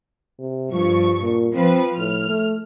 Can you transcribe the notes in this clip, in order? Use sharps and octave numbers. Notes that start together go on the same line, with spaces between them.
C3
G2 F3 C#6
A#2
F3 C4 B4
A2 F6
A3